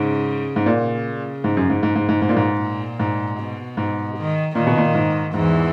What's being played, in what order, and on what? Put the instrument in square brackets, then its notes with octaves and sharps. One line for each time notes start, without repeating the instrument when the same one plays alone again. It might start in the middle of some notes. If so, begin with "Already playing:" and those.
Already playing: [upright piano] G#2 [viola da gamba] C#3
[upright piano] G#2
[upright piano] A#2 [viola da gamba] C#3
[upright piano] G#2
F#2
G#2
G#2
G#2
G#2
[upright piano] G#2 [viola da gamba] B2
[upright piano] A#2
G#2
[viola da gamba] A#2
[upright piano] G#2
[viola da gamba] B2
[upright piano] G#2
[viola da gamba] D#3
[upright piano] A#2 [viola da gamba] D#3
[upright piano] B2
A#2
G#2
[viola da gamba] E2 E3 [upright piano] G#2